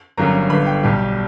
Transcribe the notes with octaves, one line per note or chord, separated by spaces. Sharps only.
G1 G2 F#3 C#4 A#4 A#5
G1 G2 D3 B4 B5
G5
B1 B2 G3